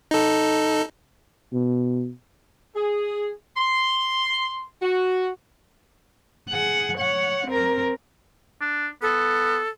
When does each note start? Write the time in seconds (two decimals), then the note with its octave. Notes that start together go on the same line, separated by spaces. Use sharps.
0.11 D#4 A4
1.53 B2
2.76 G#4
3.57 C6
4.82 F#4
6.50 G#4 F#5
6.97 C#5 F#5
7.47 C4 A#4
8.61 D4
9.02 B3 A4